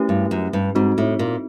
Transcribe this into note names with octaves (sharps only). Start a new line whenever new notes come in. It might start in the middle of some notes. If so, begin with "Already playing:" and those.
Already playing: A3 C#4 E4 G4 B4
G2
F#2
G2
G#2 C4 D#4 F#4
A2
A#2